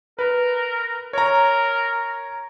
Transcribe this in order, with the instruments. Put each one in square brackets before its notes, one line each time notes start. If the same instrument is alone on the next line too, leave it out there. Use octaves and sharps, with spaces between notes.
[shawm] A#4 [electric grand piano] B4
[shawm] A#4 [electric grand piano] C#5 A#5